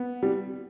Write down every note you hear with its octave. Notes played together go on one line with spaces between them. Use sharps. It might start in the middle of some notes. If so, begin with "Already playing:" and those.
Already playing: B3
G3